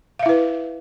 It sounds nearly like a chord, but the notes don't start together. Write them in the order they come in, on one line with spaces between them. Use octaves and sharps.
F5 E5 E4 B4